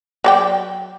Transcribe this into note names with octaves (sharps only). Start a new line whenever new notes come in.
F#3 D5 G5